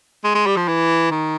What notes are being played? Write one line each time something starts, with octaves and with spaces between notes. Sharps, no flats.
G#3
G#3
G3
F3
E3
D#3